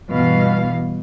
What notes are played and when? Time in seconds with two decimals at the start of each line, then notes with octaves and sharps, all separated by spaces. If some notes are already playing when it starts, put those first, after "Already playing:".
0.11 G2 B2 E3 F5